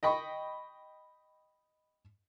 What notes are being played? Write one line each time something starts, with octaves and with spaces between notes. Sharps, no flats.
D#5 G5 B5 C#6